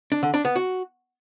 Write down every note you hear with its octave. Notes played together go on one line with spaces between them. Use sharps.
D4
D3
D4
B3
F#4